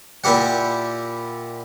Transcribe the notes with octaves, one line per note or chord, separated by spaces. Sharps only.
A#2 E4 G4 F#5